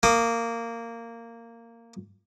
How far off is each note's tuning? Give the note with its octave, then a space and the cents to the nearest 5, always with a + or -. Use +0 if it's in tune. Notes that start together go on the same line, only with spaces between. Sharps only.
A#3 -15 D#6 -45